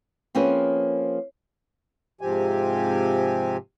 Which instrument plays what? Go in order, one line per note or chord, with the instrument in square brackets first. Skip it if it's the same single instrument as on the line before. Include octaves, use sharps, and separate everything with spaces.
[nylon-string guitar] F3 A#3 C4 C#4 G#4 B4
[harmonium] G#2 C3 F3 C4 G4 G#5